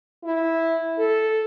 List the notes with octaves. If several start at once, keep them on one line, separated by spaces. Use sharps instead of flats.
E4
A4